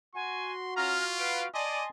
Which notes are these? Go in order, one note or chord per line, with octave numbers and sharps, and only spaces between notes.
F#4 G#5 C6
C#4 F4 A#5 F6
B4 F5 D7
D5 D#5 G#5 A5 C6 D#7